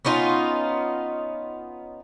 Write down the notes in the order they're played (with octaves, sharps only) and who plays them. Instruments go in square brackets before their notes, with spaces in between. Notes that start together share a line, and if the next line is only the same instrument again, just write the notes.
[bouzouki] B3 C#4 D#4 F4